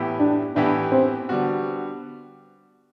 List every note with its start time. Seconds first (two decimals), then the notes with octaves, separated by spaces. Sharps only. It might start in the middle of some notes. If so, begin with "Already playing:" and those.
Already playing: A2 E3 B3 E4 G4
0.19 D4
0.55 A2 E3 B3 D4 E4 G4
0.92 C4
1.29 D3 G3 B3 F#4